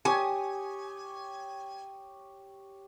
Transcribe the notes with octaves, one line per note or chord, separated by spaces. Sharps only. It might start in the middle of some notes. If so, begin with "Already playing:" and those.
G4 C#5 G#5 D#6